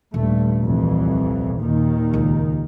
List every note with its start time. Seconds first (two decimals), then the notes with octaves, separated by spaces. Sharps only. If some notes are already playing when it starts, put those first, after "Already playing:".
0.14 D#1 G2 A3
0.64 C2 F2 E3
1.61 D#2 A#2 D#3
2.13 C#2